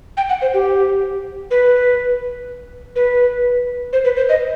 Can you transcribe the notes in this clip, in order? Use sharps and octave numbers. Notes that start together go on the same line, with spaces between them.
G5
F#5
C5
G4
B4
B4
C5
B4
C5
D#5